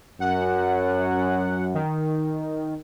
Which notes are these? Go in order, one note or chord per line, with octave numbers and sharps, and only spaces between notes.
F#2 F#5
D#3